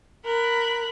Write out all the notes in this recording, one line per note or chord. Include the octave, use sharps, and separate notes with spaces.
A#4 B5 F#6